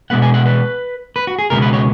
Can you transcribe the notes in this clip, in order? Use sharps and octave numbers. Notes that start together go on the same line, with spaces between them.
B2 G#3 B3 F#5
G#5
F#5
B4
B4
F#4
G#4
C#2 B2 G#3 B3 A#4
B4
C#5